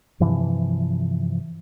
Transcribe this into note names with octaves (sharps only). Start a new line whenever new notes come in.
G2 C3 E3 F3